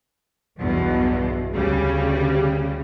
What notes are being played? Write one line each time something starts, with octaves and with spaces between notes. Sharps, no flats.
B1 E2 G2 B2
D2 C#3 G3